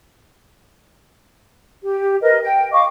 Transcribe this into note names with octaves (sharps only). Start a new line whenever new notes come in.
G4
A#4 B4 D#5
G5
D#5 F5 C#6 D6